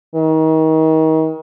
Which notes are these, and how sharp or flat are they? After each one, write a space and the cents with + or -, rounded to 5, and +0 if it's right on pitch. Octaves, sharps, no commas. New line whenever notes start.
D#3 +30